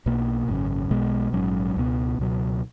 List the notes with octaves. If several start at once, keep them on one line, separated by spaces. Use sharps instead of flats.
B1 B2 A#3
G#1 F#2 C#3
B1 B2 G#3 B3
A#1 G#2 F#3 C#4
C#2 B2 G#3 B3
C#2 B2 F#3